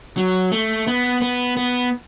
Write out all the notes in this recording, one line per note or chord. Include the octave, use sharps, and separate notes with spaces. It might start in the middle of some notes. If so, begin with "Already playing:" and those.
F#3
A3
B3
B3
B3